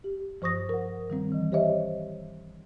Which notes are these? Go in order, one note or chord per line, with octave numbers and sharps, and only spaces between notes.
G4
G2 F3 C5 C#6 D#6 A#6
A#4 F#5
D#3 G3 C4
E3 D#5
G4 C5 C#5 D#5 E5